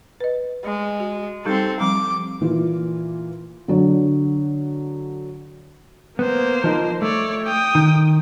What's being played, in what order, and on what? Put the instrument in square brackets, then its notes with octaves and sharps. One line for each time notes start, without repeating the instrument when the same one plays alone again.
[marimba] B4 D#5
[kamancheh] G#3
[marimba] F#4
[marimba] G3 D#4 G4 [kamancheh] C4 A4
[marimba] F3 G3 C4 [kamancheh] D6
[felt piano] A#2 E3 E4 F4
D3 F#3
[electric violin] A#3 C5 [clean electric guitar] B3
[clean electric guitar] F3 D#4 A#4
[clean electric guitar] A3 [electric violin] C#5 D5
[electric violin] G5 D#6
[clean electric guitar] D#3